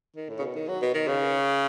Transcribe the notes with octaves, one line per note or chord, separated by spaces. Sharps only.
D#3
A2
C#3
B2
D#3
F#3
B2
D#3
C#3